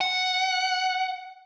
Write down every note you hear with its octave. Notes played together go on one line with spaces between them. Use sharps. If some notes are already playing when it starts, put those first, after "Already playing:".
F#5